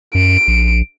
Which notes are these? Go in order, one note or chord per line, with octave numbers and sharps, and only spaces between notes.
F#2 D7
A#1